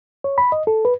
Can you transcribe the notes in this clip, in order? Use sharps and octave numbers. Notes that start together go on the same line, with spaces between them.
C#5
B5
D#5
A4
B4